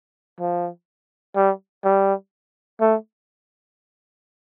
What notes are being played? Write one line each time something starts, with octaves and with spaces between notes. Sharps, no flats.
F3
G3
G3
A3